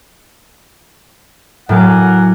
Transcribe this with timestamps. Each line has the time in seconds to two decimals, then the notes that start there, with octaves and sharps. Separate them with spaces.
1.69 A2 F#3 A#4 F#5 G#5 D6